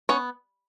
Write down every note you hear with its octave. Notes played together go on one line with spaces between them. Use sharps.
B3 C#4 C#5